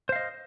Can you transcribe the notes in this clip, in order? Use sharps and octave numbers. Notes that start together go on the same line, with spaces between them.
C5 D#5 F5